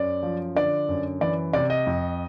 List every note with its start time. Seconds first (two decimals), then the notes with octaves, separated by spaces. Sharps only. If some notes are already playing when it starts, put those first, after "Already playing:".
Already playing: F#2 D5
0.23 F3
0.55 D3 D5
0.89 F#2
1.21 E3 D5
1.53 C3 D5
1.70 D#5
1.86 F2